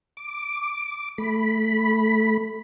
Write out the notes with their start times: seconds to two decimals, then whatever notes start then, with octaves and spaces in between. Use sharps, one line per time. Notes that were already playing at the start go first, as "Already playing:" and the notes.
0.17 D6
1.18 A3 B5